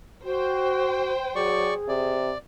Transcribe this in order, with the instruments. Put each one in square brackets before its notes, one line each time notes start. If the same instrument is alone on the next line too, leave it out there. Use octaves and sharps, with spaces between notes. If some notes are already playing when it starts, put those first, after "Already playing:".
[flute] F#4 [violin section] C5 G5
[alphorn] F#3 [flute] G#4 [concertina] D5 C#6
[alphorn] C3 [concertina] D5